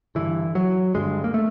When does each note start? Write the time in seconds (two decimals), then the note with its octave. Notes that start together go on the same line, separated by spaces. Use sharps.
0.15 G2 D3 E3
0.55 F#3
0.94 G2 D3 G#3
1.24 A#3
1.34 A3